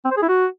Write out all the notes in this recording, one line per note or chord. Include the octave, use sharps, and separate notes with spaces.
C4
C5
G#4
E4
F#4